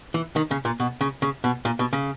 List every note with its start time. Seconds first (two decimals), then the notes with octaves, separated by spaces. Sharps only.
0.14 E3
0.36 D#3
0.51 C#3
0.65 A#2
0.80 B2
1.01 C#3
1.22 C#3
1.44 B2
1.65 A#2
1.79 B2
1.93 C#3